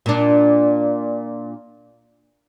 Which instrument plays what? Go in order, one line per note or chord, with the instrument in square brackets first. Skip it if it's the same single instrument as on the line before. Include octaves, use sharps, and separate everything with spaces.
[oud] A#2 D4